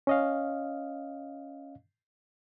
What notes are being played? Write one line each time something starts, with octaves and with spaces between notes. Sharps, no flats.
C#4 D#5 F5